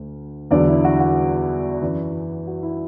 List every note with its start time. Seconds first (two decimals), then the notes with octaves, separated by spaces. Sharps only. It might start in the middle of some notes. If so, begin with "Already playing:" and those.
Already playing: D2
0.51 E2 D3 F#3 D5
0.68 E4
0.84 F#4
1.00 F#4
1.82 F#2 E3
2.47 F#4
2.63 E4